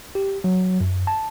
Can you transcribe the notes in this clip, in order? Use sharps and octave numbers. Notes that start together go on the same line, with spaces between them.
G4
F#3
F#2
A5